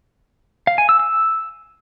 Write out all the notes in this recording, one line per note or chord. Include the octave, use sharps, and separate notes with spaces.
F5
G#5
E6
E6